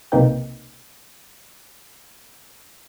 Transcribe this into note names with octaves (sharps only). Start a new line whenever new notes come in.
B1 C3 A#3 D#4 B4 G5